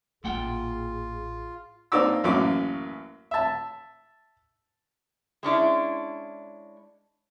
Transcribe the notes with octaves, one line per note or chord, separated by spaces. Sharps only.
A1 A#2 F4 G#4 F#5 G5
A#3 C4 D4 D#4 D6 E6
A1 F#2 A#3 D6
E5 A5
G#3 C#4 D4 E4